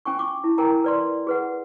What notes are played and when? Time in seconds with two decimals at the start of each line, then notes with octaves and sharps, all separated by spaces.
0.05 C#4 G5 G#5 C#6
0.19 C#6 D6
0.44 E4
0.58 A#4 G5 G#5 A#5
0.84 B4 D5 C6
1.27 G#4 B4 F#5